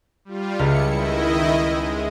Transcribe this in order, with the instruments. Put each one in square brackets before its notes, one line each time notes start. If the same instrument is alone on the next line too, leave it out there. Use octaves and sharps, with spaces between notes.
[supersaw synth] G3 F4
[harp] C#2 G3 F6 [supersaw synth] E4 C#7
[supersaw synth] D#3 E4 D#5
G#3